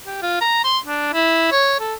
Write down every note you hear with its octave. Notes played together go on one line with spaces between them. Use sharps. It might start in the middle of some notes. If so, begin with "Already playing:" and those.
G4
F4
A#5
C6
D4
E4
C#5
A4